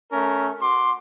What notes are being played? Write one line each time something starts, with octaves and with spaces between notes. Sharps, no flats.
A3 C#4 A#4
F#4 C6 D6